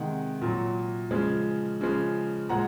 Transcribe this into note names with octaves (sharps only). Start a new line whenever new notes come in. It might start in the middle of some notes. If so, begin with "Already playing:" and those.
Already playing: C3 D#3 G#3 F#5
A#2 F#3
C#3 F3 G#3
C#3 F3 G#3
A#2 F3 G#3 F#5 A#5